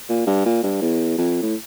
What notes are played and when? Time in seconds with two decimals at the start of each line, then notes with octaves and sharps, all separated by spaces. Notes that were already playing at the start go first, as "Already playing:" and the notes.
0.09 A#2
0.27 G2
0.45 A#2
0.63 G2
0.82 E2
1.18 F2
1.43 A2